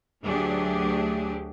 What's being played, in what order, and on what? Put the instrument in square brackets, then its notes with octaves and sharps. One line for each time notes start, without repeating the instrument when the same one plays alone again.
[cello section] D2 F#3 A3 D4 G4 G#4